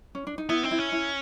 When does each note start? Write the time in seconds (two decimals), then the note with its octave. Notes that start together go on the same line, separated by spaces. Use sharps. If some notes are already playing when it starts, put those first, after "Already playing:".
0.15 C#4
0.27 D4
0.38 D#4
0.49 B3 E4
0.63 C4 D#4
0.71 E4
0.79 C#4
0.92 E4